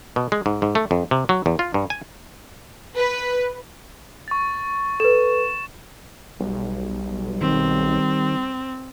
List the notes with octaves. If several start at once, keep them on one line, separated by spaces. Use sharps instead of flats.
B2
G#3
G#2
G#2
A3
F2
C3
F#3
E2
F4
G2
G#5
B4
C#6 A6
A4 B4 E7
B1 G3
D#3 C4